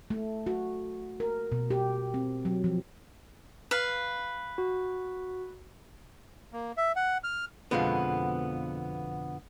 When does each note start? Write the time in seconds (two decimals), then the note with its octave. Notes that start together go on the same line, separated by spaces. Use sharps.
0.10 A3
0.47 F#4
1.20 A#4
1.52 B2
1.71 G4
2.14 C4
2.45 F#3
2.64 F3
3.71 B4 F5
4.58 F#4
6.53 A#3
6.77 E5
6.96 F#5
7.24 F6
7.71 F2 B2 D3 F3 G#3 B3